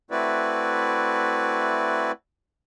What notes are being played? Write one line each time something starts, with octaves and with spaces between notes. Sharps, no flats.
A3 C4 E4 F#4 B4 D5